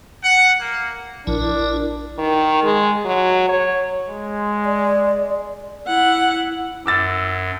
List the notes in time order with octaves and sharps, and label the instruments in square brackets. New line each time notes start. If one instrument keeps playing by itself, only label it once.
[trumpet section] F#5
A#3
[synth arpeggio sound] A#1 [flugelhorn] D4 [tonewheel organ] E4 A#4
[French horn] D#3
G#3
F#3
C#5
[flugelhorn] G#3
[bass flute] D5
[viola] E4 F#5
[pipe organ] F#2 [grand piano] D6 E6 A6